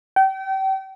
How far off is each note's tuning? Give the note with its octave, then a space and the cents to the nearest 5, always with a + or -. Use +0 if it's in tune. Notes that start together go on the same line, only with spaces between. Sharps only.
G5 -35